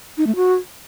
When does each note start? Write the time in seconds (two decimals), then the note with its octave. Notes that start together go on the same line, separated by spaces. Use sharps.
0.18 D#4
0.27 A3
0.36 F#4